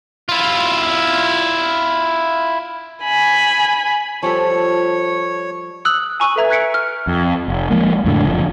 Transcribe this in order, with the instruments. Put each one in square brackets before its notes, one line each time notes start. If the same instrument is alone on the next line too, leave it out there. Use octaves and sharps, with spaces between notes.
[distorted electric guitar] E4 F4
[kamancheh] G#5 B5
[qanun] F3 G3 A4 [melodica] C#5
[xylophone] D#6 E6 F#6 F#7
G#5 A#5 C#6 E6 D#7
A4 B4 E5 A#5 G#6
F#6 G#6 B6 C#7 D7
F6
[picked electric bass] F2
F1
F3 G#3 A#3
F2 A2 D3
F#1 F3